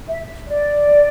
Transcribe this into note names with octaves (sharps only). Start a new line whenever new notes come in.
E5
D5